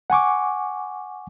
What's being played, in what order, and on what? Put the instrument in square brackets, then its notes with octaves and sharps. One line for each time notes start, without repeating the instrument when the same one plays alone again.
[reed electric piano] F#5 G#5 C#6 D6